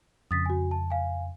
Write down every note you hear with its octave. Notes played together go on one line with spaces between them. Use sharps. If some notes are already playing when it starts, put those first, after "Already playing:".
F2 C#3 D#6 A6 B6
F#4 G#5
A5
F5 G#5